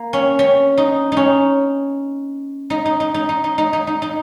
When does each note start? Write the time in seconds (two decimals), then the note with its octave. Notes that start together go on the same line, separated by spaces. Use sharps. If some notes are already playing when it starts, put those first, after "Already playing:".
Already playing: A#3
0.13 C#4
0.39 C#4
0.77 D#4
1.12 C#4 D#4
2.70 D#4
2.86 D#4
3.00 D#4
3.14 D#4
3.29 D#4
3.44 D#4
3.58 D#4
3.73 D#4
3.87 D#4
4.02 D#4